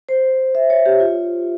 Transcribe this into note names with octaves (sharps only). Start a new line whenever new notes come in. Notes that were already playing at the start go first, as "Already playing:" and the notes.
C5
E5
C#5
G4
F4